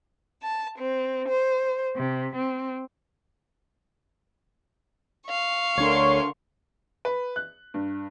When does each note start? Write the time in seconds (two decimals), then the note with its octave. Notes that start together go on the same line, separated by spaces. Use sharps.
0.42 A5
0.79 C4
1.29 C5
1.96 C3
2.35 C4
5.27 F5 C#6
5.78 D2 D3 D4 A#4 C#5 C6
7.05 B4
7.36 F#6
7.74 G2